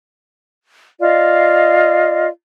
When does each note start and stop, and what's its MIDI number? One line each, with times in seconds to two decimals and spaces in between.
1.01 2.27 65
1.01 2.27 74
1.01 2.27 75
1.01 2.27 77